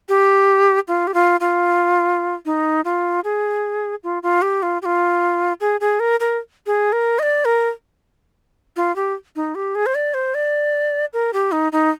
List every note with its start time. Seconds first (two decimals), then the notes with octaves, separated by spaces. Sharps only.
0.09 G4
0.88 F4
1.07 G4
1.14 F4
1.40 F4
2.45 D#4
2.85 F4
3.24 G#4
4.03 F4
4.23 F4
4.42 G4
4.63 F4
4.82 G4
4.85 F4
5.61 G#4
5.81 G#4
6.00 A#4
6.20 A#4
6.67 G#4
6.92 A#4
7.19 D#5
7.23 D5
7.45 A#4
8.76 F4
8.96 G4
9.36 D#4
9.55 G4
9.75 G#4
9.86 C5
9.95 D5
10.14 C5
10.34 D5
11.13 A#4
11.33 G4
11.52 D#4
11.72 D#4